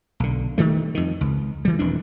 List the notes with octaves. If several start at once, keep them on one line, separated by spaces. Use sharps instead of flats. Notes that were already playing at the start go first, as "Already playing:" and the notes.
B1 D3
D#3 G3 A3
F2 D#3
C#2
E3 G3
E1 F2 E3 D4